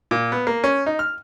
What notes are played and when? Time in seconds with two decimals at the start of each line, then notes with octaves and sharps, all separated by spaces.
0.11 A#2
0.32 B3
0.47 A#3
0.64 C#4
0.86 D#4
0.99 F6